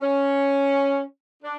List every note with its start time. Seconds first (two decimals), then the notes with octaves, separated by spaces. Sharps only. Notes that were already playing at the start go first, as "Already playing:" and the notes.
0.02 C#4
1.43 D4